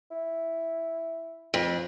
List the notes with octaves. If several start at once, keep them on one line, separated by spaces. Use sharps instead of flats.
E4
F2